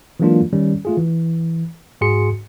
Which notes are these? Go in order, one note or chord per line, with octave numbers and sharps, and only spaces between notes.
E3 F#3 G#3 A#3 D4 F4
D#3 G3 C#4
A3 F4 G#4
E3
G#2 F#4 G#4 C6 C#7